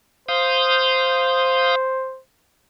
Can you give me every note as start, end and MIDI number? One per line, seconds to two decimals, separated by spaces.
0.28 2.20 72
0.28 1.75 77
0.28 1.75 87
0.28 1.75 91